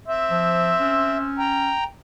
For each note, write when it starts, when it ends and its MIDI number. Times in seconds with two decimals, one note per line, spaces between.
0.08 1.48 60
0.08 1.17 76
0.31 0.74 53
0.80 1.73 61
1.39 1.84 79
1.39 1.84 82